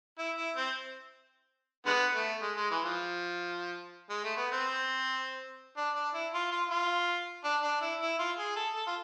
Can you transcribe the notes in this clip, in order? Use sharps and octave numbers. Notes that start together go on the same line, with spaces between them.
E4
E4
C4
D3 G#3 B3
A3
G#3
G#3
E3
F3
G#3
A3
B3
C4
D4
D4
E4
F4
F4
F4
D4
D4
E4
E4
F4
G#4
A4
A4
F4